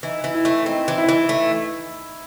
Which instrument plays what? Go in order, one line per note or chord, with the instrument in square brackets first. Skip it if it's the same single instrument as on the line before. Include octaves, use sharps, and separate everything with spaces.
[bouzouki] E3 [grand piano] D#4
[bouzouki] E3
[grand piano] E4
[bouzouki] A3
[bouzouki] C4 [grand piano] D#4
[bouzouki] E3
[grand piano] E4
[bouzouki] E3
A3